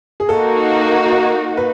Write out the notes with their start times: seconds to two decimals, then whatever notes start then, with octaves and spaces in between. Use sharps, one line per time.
0.20 G#4
0.28 A#3 D#4 F#4 A4
1.57 B4